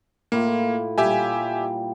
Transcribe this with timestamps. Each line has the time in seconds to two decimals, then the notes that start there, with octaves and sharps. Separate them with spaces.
0.32 A2 A#3 E4 F4
0.98 A#2 G3 G4 E5 G#5